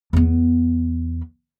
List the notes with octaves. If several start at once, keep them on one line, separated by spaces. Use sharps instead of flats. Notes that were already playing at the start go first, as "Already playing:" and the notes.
E2 B3